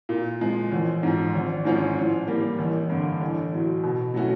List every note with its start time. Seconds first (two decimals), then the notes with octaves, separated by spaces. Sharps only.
0.09 A#2
0.41 F3 G#3
0.72 A1
1.03 G#2 F3
1.35 G#1
1.65 G#2 F3 G#3 C#4
1.97 A2
2.27 E3 G3 A#3
2.59 A1
2.90 G2 D3
3.21 A1
3.52 A2 F#3
3.83 B2
4.14 F#3 A3 C#4 F#4